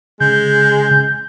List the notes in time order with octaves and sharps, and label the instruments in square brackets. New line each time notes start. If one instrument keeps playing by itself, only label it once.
[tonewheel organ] C#3 [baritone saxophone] G#3 [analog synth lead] G6